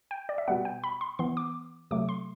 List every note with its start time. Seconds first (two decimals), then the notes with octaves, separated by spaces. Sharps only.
0.11 G5
0.29 D5
0.38 E5
0.48 B2 G3 B3 F#5
0.65 G5
0.84 B5
1.01 C6
1.19 E3 B3 C6
1.37 D6
1.91 C3 F#3 A3 D6
2.09 C6